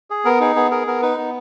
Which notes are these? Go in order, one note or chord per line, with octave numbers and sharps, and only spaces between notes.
G#4
B3 A#4
D#4 G#4
B3 G#4
G#4 A#4
B3 A#4
D#4 B4
B3